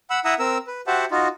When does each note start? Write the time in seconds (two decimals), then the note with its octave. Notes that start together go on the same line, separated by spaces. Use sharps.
0.10 F#5 B5 E6
0.25 E4 E5 F#5 A#5 D#6 E6
0.39 C4 A#4 E6
0.67 B4
0.87 F#4 G4 C5 E5 F#5 A5
1.11 D#4 F4 F#4